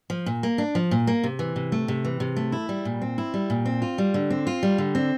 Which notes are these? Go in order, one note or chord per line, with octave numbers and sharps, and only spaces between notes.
F3
A#2
A#3
D4
F3
A#2
A#3
C3
E3
C3
A3
C3
E3
C3
A3
E4
G3
A#2
C4
E4
G3
A#2
C4
F4
G3
D3
C4
F4
G3
D3
C4